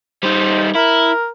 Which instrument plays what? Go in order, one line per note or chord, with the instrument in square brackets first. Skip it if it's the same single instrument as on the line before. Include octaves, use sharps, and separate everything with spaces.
[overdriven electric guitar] G3 D#4 [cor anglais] C5
[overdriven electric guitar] E4 [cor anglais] A#4